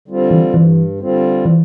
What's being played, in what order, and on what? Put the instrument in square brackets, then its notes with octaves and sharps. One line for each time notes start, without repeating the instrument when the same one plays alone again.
[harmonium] D3 G3 C4 F4
[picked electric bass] E3
[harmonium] G2 [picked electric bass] E3
[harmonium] D3 G3 C4 F4
[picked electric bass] E3